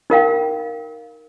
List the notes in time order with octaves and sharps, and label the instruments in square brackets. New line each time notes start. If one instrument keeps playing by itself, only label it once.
[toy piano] D#4 A#4 F5 G5